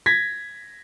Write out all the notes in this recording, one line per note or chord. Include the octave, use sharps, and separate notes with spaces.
G#6 A#6 B6